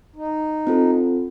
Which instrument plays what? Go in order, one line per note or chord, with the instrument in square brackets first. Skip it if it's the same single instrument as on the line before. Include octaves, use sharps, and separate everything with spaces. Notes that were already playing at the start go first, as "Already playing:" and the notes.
[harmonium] D#4
[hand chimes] C4 F4 A4